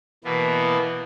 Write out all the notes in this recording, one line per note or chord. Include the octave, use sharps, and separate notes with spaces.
B2 E3 A#3 B3